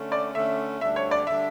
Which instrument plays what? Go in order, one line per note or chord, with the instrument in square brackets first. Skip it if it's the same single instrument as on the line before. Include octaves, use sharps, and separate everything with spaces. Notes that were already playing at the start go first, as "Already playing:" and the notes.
Already playing: [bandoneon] D3 A3 C#4
[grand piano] D5
[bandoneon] D3 A3 C#4 [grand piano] E5
[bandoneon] D2 D3 G3 D4 [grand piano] E5
[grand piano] C#5
D5
[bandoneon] D3 G3 D4 [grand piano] E5